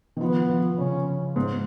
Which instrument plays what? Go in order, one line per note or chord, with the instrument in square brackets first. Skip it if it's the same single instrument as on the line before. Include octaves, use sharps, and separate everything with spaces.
[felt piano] D#3
[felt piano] F3 [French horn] B3
[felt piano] F3
[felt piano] C#3 [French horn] C#4
[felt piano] G#2